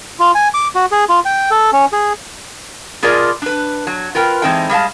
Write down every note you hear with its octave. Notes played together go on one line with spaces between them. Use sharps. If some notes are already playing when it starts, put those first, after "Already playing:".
F4
G#5
D6
F#4
G#4
F4
G5
A4
C#4
G#4
B2 F4 G#4 A#4 D5
D4 B4
F#3
F4 A#4 B4 G5
E3 G#3 C4 D#4 A4 G5
G3 G#3 F5 A5